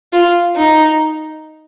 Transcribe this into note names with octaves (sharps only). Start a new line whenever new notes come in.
F4
D#4